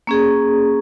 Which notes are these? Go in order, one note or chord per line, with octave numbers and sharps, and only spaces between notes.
A#3 C#4 G#4